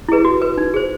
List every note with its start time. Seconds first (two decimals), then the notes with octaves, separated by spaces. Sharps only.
0.09 E4 G#4 B4
0.25 F#4
0.42 B4
0.58 D#4
0.74 G#4 C5